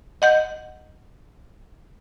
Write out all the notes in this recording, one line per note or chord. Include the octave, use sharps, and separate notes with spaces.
D#5 F#5 G6